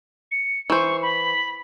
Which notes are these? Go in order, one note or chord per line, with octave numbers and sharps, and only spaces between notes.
C#7
E3 C5 C#6
B5